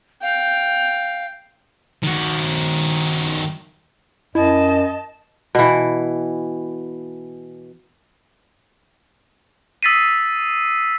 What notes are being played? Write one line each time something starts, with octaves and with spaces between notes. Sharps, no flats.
F5 G5
D#3 F#4
F#2 E4 D#5 A5
B2 E3
D#6 E6 A6 B6 C7 D#7